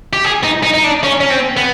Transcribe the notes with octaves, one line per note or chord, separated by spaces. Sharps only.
G4
G#4
D#4
D#4
D#4
D4
C#4
C#4
C4
B3